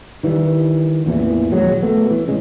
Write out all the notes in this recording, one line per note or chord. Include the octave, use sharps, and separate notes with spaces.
D#3 E3 G3
A1 E2 A#2 E3
D#1 A#1 F#3 G#3
A3 B3
E3
A1 C#3 G#3